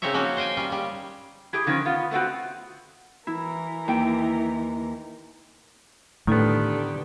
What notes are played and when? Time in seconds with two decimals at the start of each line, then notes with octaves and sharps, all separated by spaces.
0.02 C#3 C4 D#4 A#4 C#5 E5
0.14 F3 A#3 C#4 D#4 F4 F#4
0.37 C5 D#5 G5 G#5
0.57 G3 C#4 F4
0.72 G3
1.53 E4 G4 G#4
1.66 D3 D#3 F3 C#4
1.85 B3 F4
2.11 A3 B3 C4 F#4
3.27 E3 E4 A#4
3.88 D#2 G5
6.27 A2 D3 D#3 B3 G4